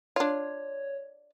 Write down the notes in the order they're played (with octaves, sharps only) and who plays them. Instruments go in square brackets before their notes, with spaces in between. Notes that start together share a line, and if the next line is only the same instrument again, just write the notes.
[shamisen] D4 F4 [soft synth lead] C#5